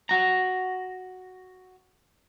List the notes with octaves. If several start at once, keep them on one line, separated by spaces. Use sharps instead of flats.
F#4 A#5